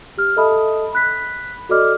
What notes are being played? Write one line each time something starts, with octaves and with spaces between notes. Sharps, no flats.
G4 F6
A4 D#5 E5 A5 B5 D#6
B5 F#6 B6
F#4 A4 D5 D#5 D6 F6